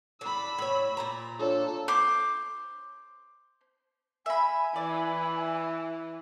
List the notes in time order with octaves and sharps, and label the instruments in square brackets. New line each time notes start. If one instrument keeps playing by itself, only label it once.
[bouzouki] A2 D4 [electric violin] B5 E6
[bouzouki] A2 C#5
A#2 C5 A#5
[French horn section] D4 F4 C#5 [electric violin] A4
[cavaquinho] C5 D6
[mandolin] E5 B5 [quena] G#5
[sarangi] E3 [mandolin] D5